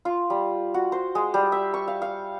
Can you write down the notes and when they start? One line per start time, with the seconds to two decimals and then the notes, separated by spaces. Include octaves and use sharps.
0.05 F4
0.30 G3
0.74 F#4
0.92 C5
1.15 G#3
1.34 G3
1.52 E5
1.74 C#6
1.88 F5
2.02 F5